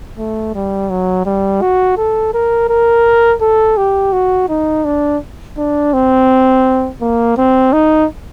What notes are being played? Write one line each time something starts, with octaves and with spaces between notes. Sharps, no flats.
A3
G3
F#3
G3
F#4
A4
A#4
A#4
A4
G4
F#4
D#4
D4
D4
C4
A#3
C4
D#4